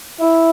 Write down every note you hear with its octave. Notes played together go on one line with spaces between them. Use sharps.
E4